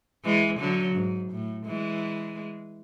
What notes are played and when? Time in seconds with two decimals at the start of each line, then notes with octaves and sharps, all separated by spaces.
0.25 E3 G#3
0.60 D3 F#3
0.95 G#2
1.31 A2
1.66 E3 G#3